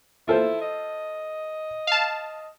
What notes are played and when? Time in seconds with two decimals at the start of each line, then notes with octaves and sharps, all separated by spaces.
0.28 E4 F4 A4 C5
0.61 D#5
1.87 F5 A5